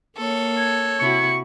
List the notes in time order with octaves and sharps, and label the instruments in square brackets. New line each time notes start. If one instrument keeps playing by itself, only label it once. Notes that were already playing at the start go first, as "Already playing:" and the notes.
[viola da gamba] A#3 [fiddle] A4 C#5
[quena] G#6
[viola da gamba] C3 E4 F#4 [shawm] C#6